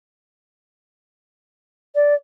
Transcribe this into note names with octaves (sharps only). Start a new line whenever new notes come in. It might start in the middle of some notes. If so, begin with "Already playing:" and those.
D5